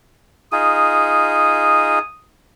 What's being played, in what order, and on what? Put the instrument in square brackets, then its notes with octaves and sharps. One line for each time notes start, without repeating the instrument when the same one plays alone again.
[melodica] D#4 F4 G#4 [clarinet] D#6